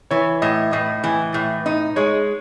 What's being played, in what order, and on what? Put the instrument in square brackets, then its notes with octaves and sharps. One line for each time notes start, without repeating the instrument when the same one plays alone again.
[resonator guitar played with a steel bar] E3 [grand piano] C#5
[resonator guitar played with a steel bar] A2 [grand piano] D#5
[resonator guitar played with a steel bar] A2 [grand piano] D#5
[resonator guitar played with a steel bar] E3
A2
D#4
[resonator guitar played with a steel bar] G#3 [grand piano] C#5